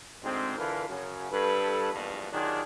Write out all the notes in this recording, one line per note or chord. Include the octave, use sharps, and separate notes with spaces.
D2 G#2 G#3 C4
D3 E3 F4 A#4 B4
F#2 C#3 F#3
G2 A4 B4
A#1 E2 G2 B2
D#3 F#3 D4 F4 G4 G#4